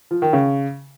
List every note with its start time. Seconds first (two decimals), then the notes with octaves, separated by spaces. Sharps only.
0.11 F3
0.22 D#3
0.33 C#3